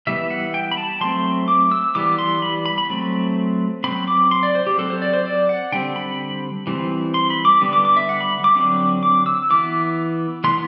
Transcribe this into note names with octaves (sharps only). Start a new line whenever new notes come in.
E3 G3 B3 E5
F#5
G5
B5
A5
F#3 A3 C4 C6
D6
E6
E3 G3 B3 D6
C6
B5
B5
B5
F#3 A3 C4
F#3 C4 B5
D6
C6
D5
C5
G4
F#3 C4 A4
C5
D5
C5
D5
F#5
D3 G3 C4 G5
B5
E3 G3 C4
C6
B5
D6
D3 G3 B3
D6
D6
E5
F#5
B5
D6
D3 F#3 C4
D6
E6
E3 B3 D6
E3 B3 C6